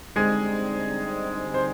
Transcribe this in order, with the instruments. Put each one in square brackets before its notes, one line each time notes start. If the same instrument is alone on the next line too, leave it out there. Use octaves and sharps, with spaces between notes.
[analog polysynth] D3 G3 C4 D#4 [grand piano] G#3 G#4
[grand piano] C5